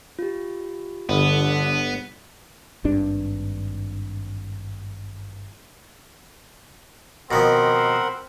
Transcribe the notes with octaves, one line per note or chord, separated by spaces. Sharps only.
F4 G4
G1 D3 B3
G#1 G2 D4
B2 D#3 F3 C4 A#4 F#5 B5